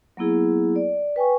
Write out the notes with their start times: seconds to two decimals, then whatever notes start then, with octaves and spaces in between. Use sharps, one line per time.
0.17 F#3 A#3 B3 E4 G#4
0.76 D5
1.16 B4 G5 G#5 C#6